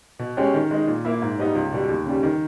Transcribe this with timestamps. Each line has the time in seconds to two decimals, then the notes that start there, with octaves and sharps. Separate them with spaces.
0.19 B2
0.37 G#3 C#4 G4
0.54 D#3
0.71 G#3 D#4
0.88 A#2
1.05 A#3 E4
1.22 G#2
1.39 G3 B3 D#4
1.55 C#2
1.72 B2 G3
1.89 D#2
2.06 C#3 G3
2.23 D#3